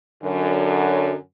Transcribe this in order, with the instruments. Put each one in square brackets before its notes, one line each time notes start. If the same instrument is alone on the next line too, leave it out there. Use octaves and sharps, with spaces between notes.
[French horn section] F#2 D3 F#3